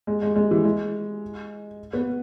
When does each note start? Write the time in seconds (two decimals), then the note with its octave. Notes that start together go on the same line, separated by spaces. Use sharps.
0.07 G#3
0.22 G#3
0.36 G#3
0.51 E3
0.64 G#3
1.93 B3